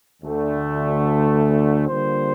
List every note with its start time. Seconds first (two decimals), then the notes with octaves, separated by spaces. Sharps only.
0.23 D2 D3 A3
1.87 D3 G3 A#3 F4 C5